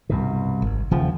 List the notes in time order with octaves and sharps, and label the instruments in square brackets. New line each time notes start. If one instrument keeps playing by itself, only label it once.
[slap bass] C2 G2 B2
[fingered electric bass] G#1
[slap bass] D#1 [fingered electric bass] E2 C#3 F3